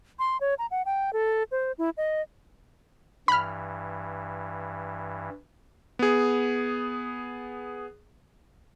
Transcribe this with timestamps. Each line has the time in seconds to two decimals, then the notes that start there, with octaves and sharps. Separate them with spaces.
0.19 C6
0.41 C#5
0.59 A#5
0.71 F#5
0.85 G5
1.13 A4
1.51 C5
1.78 E4
1.97 D#5
3.28 G2 E3 B5 F6
5.99 B3 G#4